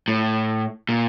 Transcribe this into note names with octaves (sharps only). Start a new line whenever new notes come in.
A2
A#2